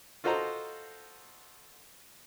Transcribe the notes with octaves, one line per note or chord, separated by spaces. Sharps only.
F4 F#4 A4 C5 D#5 A#5